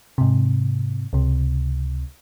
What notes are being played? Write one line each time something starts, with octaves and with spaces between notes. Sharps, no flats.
G#2 C3
C#2 C3